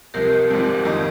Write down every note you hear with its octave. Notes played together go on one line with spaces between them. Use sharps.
C#2 C3 F3 G4 A#4
G#1 G#2 F3 C4
F2 D#3 A#3 D#4